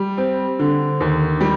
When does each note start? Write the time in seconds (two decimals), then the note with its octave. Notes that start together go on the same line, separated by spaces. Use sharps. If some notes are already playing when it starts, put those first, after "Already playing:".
Already playing: G3
0.18 C4
0.59 D3
1.00 D#2
1.41 G3